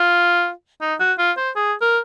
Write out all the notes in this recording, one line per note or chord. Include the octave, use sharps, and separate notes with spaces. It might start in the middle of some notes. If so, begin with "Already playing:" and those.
Already playing: F4
D#4
F#4
F4
C5
G#4
A#4